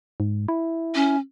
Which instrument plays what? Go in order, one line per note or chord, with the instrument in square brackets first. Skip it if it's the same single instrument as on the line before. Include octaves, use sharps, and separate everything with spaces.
[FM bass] G#2
E4
[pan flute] C#4